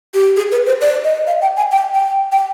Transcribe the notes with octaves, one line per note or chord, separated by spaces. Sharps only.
G4
G#4
B4
C5
D5
D#5
F5
G5
G#5
G5
G5
G5